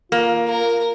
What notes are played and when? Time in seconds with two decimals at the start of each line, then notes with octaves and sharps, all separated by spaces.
0.12 A#3 F4
0.48 A#4